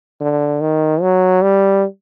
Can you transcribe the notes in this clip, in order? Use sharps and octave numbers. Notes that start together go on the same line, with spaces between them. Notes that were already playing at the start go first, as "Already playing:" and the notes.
D3
D#3
F#3
G3